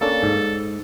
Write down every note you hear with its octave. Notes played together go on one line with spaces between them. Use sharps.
A#3 C#4 D4 A4
G#2